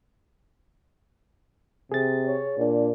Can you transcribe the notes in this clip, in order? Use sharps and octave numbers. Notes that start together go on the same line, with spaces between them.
C3 G#4 A6
C#5
A#2 D4